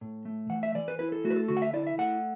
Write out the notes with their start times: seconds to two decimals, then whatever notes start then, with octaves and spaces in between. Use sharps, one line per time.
0.01 A2
0.25 A3
0.50 E3 F#5
0.63 E5
0.75 E3 D5
0.88 B4
0.99 E4 B4
1.12 A4
1.24 A3 F#4
1.30 B4
1.36 A4
1.48 D3 F#4
1.57 F#5
1.62 E5
1.73 E4 D5
1.87 E5
1.98 A3 F#5